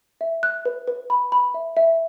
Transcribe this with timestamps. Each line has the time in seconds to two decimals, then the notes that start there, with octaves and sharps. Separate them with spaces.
0.21 E5
0.43 F#6
0.65 B4
0.87 B4
1.10 B5
1.32 B5
1.54 E5
1.77 E5